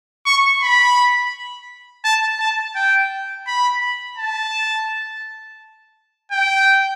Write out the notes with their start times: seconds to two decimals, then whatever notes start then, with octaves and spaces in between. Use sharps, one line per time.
0.26 C#6
0.62 B5
2.04 A5
2.40 A5
2.76 G5
3.47 B5
4.18 A5
6.32 G5